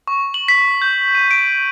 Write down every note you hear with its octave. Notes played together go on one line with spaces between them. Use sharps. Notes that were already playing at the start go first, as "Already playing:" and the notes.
C#6
F#7
B6
G6
D#7
D7